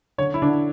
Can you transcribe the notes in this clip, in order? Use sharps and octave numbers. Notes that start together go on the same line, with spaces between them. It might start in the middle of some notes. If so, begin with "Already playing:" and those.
D3 C#5
E4
D3 D4